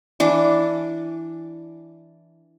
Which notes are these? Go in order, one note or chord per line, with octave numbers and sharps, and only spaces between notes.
E3 D4 D6